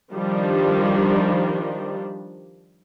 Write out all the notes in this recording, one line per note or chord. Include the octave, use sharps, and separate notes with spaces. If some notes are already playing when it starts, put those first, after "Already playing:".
D#3 F3 G3 D4